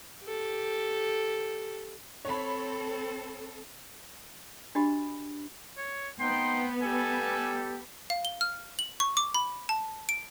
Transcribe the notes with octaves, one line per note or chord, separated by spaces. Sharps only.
G4 A4
C4 A4 C#5 B5
D4 F#4 G4 D#5 B5
C#5
B3 C4 D#4 F#5 G5 C6
G3 G4 A4 G#5
F5
G7
F6
F#7
C#6
D6
B5
A5
D7